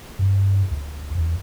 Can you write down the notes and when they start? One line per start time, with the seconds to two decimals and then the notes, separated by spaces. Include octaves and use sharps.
0.19 G2
0.71 D2
1.15 E2